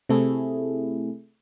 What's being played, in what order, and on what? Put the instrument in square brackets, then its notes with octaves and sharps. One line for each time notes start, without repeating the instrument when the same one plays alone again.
[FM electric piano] C3 A3 E4 G#4